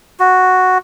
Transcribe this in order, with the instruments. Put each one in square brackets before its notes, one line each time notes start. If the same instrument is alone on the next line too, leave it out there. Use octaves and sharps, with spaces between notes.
[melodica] F#4